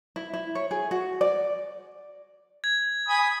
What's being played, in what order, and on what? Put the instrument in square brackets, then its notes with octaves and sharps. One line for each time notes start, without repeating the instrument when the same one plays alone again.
[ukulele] E4
E4
C#5
G#4
F#4
D5
[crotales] G#6
[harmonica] G#5 B5 D#6